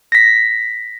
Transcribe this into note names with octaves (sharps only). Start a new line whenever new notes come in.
A#6 B6